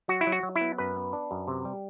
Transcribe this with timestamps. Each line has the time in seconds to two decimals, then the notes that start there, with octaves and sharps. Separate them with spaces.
0.08 F#3 F#4
0.21 E4
0.27 F#3
0.32 F#4
0.43 F#3
0.56 E4
0.61 B3
0.78 F#2 B4
0.96 B3
1.13 D4
1.31 F#2
1.48 C3
1.65 G3